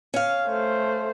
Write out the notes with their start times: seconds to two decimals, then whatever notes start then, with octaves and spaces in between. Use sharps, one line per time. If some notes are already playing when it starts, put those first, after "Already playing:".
0.14 C#4 F5
0.47 A3 C5